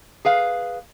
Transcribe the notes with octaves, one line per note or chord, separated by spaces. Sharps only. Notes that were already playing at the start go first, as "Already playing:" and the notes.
G#4 B4 F5